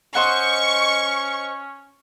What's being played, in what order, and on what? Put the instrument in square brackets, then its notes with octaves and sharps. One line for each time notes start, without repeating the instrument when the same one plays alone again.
[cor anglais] C#4 [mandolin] C5 D#5 F#5 [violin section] C#6